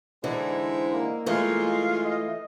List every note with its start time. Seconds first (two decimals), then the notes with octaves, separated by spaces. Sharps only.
0.24 D3 E3 G#3 D#4 E4 C5
0.93 A#3
1.26 E3 G#3 A3 F4
2.04 D#5